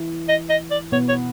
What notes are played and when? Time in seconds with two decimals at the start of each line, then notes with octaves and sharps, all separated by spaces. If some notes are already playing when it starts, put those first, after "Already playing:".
Already playing: E3 E4
0.28 D#5
0.49 D#5
0.71 D5
0.92 B2 B3 C#5
1.08 C#5